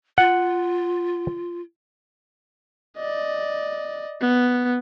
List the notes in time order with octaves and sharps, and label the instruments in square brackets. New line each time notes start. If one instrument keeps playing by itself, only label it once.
[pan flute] F4 [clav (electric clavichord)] F#5
[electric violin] D5 D#5
B3